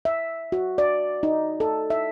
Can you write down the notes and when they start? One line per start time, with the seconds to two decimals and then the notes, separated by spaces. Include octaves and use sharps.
0.05 E5
0.52 F#4
0.78 D5
1.23 D#4
1.60 A4
1.90 E5